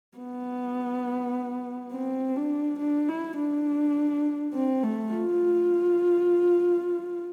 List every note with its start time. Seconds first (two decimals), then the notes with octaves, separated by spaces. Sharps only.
0.17 B3
1.92 C4
2.36 D4
2.79 D4
3.09 E4
3.37 D4
4.54 C4
4.83 A3
5.12 F4